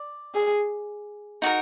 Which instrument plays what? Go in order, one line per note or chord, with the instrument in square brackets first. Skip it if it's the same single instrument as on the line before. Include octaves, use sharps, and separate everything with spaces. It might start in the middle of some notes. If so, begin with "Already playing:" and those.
Already playing: [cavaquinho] D5
[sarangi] G#4
[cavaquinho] D#4 F#4 A#4